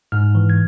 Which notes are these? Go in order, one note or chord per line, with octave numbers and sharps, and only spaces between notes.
G#2 F6
E3
G#6